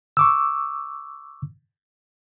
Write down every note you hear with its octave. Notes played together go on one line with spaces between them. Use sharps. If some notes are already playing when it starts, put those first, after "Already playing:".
C#6 D6 E6